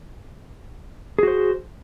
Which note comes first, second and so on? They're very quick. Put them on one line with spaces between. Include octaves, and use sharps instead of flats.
G#4 F#4 C5